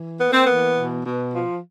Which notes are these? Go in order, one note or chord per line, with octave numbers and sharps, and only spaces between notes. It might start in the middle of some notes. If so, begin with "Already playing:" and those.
Already playing: E3
A#3 B3
C4
E3 B3
B2
B2
F3